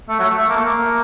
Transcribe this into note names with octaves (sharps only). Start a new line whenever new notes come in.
A3
F#3
A3
A3
A#3
A3
A#3